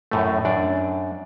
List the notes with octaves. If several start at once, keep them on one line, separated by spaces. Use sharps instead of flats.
F#2 A2 A3
F#2 D4 D5